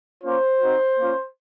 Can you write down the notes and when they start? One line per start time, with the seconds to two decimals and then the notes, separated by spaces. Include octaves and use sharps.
0.24 A#3 C#4 F4 C5
0.61 C4 D#4 F#4
0.99 A#3 C#4 F4